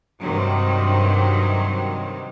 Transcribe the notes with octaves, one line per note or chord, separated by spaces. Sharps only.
G2 C3 D#3 F#3